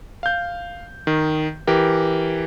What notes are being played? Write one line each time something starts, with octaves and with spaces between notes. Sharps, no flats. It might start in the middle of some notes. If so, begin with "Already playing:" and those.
F5 G6
D#3
E3 G4 A#4